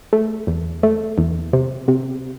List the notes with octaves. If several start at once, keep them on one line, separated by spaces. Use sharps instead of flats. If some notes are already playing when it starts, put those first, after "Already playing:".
A3
E2
A3
E2
C3
C3